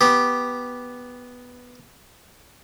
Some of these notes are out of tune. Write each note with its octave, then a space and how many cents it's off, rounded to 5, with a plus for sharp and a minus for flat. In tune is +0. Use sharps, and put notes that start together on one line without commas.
B3 +0 G4 +0